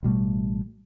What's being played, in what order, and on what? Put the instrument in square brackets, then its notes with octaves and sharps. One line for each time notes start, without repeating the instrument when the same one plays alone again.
[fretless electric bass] A1 B2 G3 A3